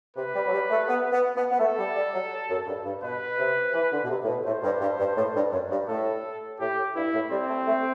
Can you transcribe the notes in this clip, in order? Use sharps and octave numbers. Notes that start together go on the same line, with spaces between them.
C3 B4
G3
F#3
G3
A3
B3
B3
B3
B3
A3 A4
G3
G3
F#3
F#2
G2
G2
B2 B4
C3
E3
D3
B2
C3
A2
B2
A2 C5
G2
G2
G2
A2
G2
F#2
G2
A2 A4
A2 G4
G2 E4
A2
G3 C4
A3
A3